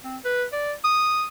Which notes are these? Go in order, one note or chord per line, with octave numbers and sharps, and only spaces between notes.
C4
B4
D5
D#6